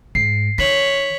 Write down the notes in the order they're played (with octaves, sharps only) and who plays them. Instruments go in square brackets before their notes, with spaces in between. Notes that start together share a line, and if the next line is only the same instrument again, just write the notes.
[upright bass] G#2 [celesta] C7
[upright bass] D#3 [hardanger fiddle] C#5 [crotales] B6 F#7